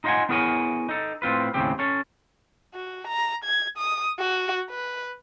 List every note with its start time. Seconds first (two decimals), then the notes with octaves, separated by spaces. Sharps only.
0.04 D#4 F4 D#5 F5 F#5 G#5
0.29 B3 E4 G#4 A#4 C#5 G#5
0.89 D#4 A4
1.22 A2 C4 F4 B4
1.54 D#2 A2 C#3 C4 G4
1.79 C#4 A4
2.74 F#4
3.07 A#5
3.44 G#6
3.78 D#6
4.19 F#4
4.70 B4